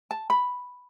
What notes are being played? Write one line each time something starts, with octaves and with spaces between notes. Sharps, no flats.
A5
B5